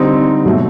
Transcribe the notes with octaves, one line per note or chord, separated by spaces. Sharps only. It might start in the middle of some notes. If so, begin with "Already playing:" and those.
Already playing: D3 G3 C4 D#4
B2 F#3 A3